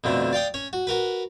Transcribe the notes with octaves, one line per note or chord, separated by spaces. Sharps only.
F2 B2 D3 A3
D5 F5 G5 D#6
C#4 C#5
F#4
F#4 A#4 B4